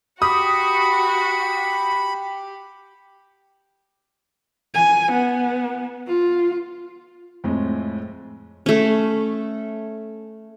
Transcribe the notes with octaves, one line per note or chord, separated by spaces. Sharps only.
F#4 G4 F#5 B5 D#6
G#5
B3
F4
F2 A2 G#3
A3 C#4